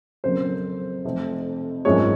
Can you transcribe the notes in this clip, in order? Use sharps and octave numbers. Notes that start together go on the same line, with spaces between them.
F2 C#3 F#3 A#3 C5
F1 F2 C3
G#1 F#2 F3 G#3 C#5